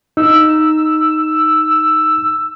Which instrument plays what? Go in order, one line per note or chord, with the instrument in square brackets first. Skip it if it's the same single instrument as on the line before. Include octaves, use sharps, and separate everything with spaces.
[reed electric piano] D#4 [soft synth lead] E6